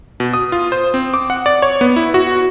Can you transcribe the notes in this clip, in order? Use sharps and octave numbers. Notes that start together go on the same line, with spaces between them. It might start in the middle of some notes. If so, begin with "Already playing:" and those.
B2
D#6
F4
C5
C4
D6
F#5
D5
C#5
B3
E4
F#4